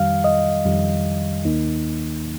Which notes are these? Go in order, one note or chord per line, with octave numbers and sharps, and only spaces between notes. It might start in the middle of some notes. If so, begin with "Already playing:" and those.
Already playing: F2 D#3 G3 F5
D#5
F2 D#3 G3
D#2 D#3 A#3 D#4